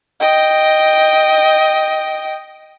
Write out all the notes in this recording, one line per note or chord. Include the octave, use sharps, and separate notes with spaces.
D#5 G5